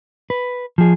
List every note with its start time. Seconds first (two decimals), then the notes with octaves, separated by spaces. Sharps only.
0.30 B4
0.78 F3 G#4